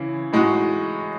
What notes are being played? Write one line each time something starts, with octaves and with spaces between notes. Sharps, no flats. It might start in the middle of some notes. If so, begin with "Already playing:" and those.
Already playing: C#3 E3 E4
A2 G#3 D#4 F#4